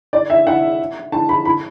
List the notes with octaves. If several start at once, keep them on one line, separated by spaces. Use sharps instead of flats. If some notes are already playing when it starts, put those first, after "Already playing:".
D5
E5
F#5
A5
B5
B5